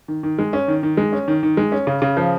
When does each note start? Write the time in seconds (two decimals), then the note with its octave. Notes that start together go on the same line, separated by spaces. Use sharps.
0.08 D#3
0.23 D#3
0.39 G#3
0.53 C#4
0.68 D#3
0.83 D#3
0.97 G#3
1.13 C#4
1.28 D#3
1.43 D#3
1.57 G#3
1.72 C#4
1.87 C#3
2.02 C#3
2.17 F3